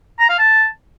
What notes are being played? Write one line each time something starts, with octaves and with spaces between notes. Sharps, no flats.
A#5
F5
A5